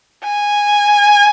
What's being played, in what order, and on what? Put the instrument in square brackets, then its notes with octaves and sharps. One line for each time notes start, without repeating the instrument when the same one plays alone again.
[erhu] G#5